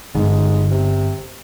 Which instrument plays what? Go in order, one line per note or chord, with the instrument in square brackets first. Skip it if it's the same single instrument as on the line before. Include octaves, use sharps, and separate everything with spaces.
[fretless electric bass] G1 [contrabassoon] G#2
[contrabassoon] C3